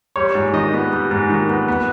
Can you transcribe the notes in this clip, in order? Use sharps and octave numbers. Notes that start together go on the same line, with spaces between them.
G3 C#5
G#2
D#3 D#5
B3
G3
G#2
D#3
B3
B3